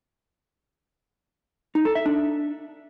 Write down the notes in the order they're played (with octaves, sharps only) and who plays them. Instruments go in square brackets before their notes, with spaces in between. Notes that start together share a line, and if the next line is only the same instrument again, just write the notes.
[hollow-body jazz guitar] D#4
A4
E5
D4